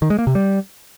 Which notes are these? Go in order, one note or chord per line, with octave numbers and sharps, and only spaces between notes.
D#3
G#3
A#3
C3
G3